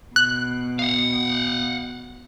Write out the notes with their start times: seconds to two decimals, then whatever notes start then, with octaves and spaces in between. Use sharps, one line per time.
0.16 B2 F#6
0.79 F5 F#5